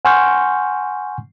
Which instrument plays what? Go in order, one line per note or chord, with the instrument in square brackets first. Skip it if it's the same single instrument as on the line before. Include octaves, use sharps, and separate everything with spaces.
[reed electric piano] F#5 G#5 C6 C#6 F6 G6